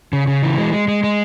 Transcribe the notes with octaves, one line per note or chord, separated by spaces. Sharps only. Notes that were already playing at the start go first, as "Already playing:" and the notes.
C#3
C#3
E3
G#3
G#3
G#3
G#3